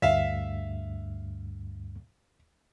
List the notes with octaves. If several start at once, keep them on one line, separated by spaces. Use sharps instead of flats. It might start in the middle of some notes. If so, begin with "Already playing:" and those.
D2 G2 E5 F5